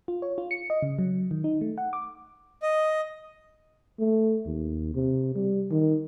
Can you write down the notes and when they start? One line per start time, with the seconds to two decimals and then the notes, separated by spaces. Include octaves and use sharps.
0.08 F4
0.22 C#5
0.38 F4
0.51 C#7
0.70 D#5
0.82 C#3
0.99 F#3
1.31 D#3
1.44 D#4
1.61 A3
1.78 F#5
1.93 D6
2.62 D#5
3.99 A3
4.46 D#2
4.94 C3
5.35 G3
5.71 D#3